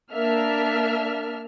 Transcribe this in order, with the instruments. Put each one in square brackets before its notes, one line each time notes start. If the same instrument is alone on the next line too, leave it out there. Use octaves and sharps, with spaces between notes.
[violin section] A#3 D4 E5 F6